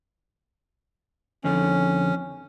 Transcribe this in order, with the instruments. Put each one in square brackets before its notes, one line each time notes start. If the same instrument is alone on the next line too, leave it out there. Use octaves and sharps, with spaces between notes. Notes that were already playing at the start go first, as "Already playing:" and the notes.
[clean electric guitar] F2 D3 [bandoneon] C#4